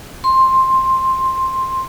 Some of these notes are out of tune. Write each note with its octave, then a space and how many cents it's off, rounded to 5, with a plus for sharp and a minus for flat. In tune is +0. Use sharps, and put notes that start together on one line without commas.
C6 +10